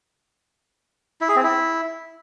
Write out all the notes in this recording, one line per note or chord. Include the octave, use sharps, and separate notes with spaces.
E4
G#4
C4
E4